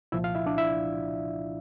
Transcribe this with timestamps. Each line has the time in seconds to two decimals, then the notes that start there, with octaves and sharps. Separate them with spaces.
0.12 C2 A#2 F3 E4 E5
0.24 F4 F5
0.35 E4 E5
0.46 D4 D5
0.58 E4 E5